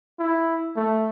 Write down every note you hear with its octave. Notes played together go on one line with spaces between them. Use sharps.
E4
A3